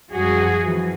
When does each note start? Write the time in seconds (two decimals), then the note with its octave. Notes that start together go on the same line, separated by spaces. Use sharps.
0.12 F#2 F3 G3 F#4 G#4
0.60 F#2 E3 F3